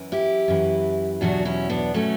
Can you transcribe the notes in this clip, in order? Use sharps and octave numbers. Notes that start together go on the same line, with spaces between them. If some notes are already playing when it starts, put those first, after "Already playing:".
Already playing: F#2 E3
E4 G4
F#2 E3
E2 B2 F#3 D4 F#4
C#4 E4
B3 D4
B2 F#3 A3 C#4